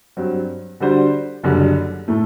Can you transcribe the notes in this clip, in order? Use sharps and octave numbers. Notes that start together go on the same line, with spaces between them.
G2 F#3 C4
D3 G3 D4 F#4 C5
F#1 F#2 D3 G3
A2 A3